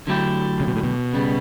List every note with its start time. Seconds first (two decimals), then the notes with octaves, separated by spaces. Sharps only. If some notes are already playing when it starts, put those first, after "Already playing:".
0.07 D3 F#3 A3 E4 G4
0.60 C#3
0.67 B2
0.75 A2
0.83 B2
1.13 C#3 G3 B3